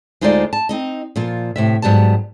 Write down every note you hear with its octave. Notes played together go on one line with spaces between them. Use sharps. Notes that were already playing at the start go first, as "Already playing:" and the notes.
D2 G#3 D#4 F4 C5 D5
A5
C4 D#4 D#5
A#2 F3 F4
A2 C3 E5
G#2 F#3 G3 B3 A5